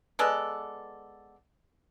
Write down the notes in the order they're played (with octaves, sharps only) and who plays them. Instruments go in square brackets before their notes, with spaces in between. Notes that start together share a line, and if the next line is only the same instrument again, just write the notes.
[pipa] G#3 B3 A4 D5